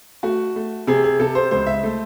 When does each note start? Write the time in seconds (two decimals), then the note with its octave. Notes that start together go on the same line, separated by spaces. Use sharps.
0.23 A3 F#4
0.56 A3
0.87 C3 G#4
1.04 G#4
1.20 C3 A4
1.35 C5
1.51 C#2 C5
1.66 E5
1.83 A3